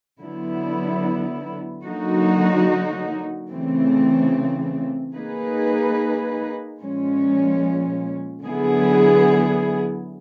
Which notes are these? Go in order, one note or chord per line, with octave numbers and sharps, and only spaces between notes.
D3 F#3 B3 E4
D3 F#3 A#3 D#4 F#4
C#3 E3 A3 C4
A#3 D#4 G#4 B4
A#2 F3 G#3 C#4
D3 F#3 B3 E4 G#4